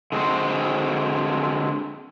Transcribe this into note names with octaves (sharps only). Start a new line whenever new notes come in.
D3 G#3 C4 F#4 C5